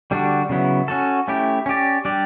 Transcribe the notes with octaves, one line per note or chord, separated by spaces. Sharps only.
D3 G3 D4 F#4
C#3 F#3 B3 E4
C#4 F#4 A4
A3 C#4 E4 G4
C#4 G4 D5
G3 D4 G4 D5